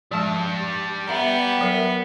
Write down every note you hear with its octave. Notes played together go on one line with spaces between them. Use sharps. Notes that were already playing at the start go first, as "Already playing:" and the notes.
F3 G3 G#3 A5
B3 E5 F#5 A#5
F#3 A#4 E5